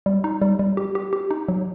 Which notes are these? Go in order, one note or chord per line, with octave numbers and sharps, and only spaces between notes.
G3
D#4
G3
G3
G4
G4
G4
D#4
F#3